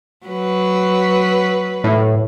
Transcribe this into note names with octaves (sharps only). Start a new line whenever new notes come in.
F#3 B4
A2